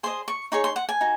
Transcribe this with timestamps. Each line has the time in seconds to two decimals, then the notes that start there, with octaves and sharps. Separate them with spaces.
0.03 G#4 C5 D#5 C6
0.28 C#6
0.52 D#4 G#4 C#5 C#6
0.64 C6
0.76 F#5
0.89 G#5
1.01 D#4 F#4